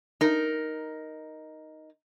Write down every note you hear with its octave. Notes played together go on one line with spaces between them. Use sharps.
D#4 A#4